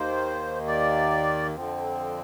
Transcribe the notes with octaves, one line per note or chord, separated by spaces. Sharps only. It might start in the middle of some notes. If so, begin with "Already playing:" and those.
Already playing: D#2 D#3 A#3 C5
D5
F2 D3 F3 C4